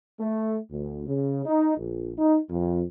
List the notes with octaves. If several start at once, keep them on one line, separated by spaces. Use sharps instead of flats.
A3
D2
C#3
D#4
A#1
D#4
F2